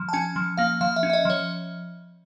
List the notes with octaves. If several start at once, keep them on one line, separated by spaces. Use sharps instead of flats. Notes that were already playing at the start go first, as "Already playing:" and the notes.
Already playing: F3
A5
C#4 G#5
F3
A#3 F5
F3 F5
E5
C#4
E5
D#5
F3 C#5